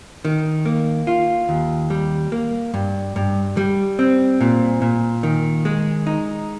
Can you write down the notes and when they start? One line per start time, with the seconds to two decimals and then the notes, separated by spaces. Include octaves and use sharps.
0.25 D#3
0.66 A#3
1.07 F4
1.49 D#2
1.90 G3
2.32 A#3
2.74 G2
3.16 G2
3.57 G3
3.99 C4
4.41 A#2
4.82 A#2
5.23 D#3
5.65 G#3
6.07 D#4